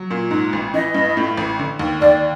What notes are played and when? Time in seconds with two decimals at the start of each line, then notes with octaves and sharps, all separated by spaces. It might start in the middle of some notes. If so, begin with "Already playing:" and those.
Already playing: F#3
0.11 A#2
0.31 G#2
0.53 A1
0.74 E3 D#5
0.94 G2
1.17 A2
1.37 A1
1.59 D3
1.79 D#2
2.01 D#2 D5